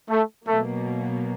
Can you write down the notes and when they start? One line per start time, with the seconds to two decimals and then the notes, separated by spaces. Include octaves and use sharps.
0.09 A3
0.47 B2 F#3 A3 A#3